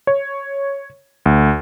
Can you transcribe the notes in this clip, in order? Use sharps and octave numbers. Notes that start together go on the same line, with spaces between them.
C#5
D2